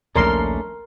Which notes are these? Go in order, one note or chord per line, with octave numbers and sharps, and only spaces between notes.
A#1 D#2 A#2 A3 C#4 D4 A#4 C6